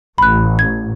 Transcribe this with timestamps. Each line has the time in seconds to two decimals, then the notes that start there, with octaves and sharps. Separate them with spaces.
0.18 A1 B5 F#6
0.59 G#6